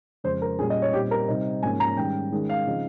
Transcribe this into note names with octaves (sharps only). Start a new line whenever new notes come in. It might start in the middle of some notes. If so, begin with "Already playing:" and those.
F2 C#3 G#3 C5
A#4
A#2 G3 C#4 G#4
D#5
C#5
A#2 G3 C4 D#4 G4
A#4
C3 G3 C4 D#4
G#2 F3 A#3 C#4 G#5
A#5
G#2 D#3 G3 C#4 G5
D#3 G#3 C#4
F5
C#3 F3 C4 D#4